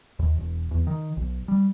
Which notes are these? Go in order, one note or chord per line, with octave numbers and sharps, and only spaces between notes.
D#2
E1
E2
D#3
B1
G3